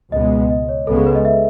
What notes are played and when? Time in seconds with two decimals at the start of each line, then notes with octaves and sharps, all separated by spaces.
0.12 C#2 B2 G#3 B3 D#5
0.50 D#5
0.69 C#5
0.87 C#2 C#3 G#3 B3 A4
0.96 G#4
1.07 B4
1.15 D#5
1.25 E5